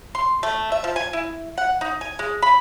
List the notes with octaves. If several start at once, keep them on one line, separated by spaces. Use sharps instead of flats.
C6
A3
E5
F3
G#5
E4
F#5
D#4
G#5
G#3
B5